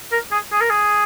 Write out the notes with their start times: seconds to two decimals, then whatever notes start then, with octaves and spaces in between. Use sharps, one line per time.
0.12 A#4
0.32 G#4
0.52 G#4
0.61 A#4
0.70 G#4